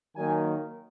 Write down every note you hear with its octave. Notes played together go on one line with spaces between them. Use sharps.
D#3 F#3 A#3 G#5